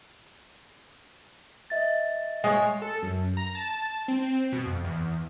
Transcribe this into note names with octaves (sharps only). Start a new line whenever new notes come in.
D#5 E5 A6
G#3 C#5
A4
F#2
A#5
A5
C4
B2
F2
E2